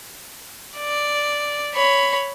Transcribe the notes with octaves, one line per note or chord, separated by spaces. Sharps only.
D5
C#5 B5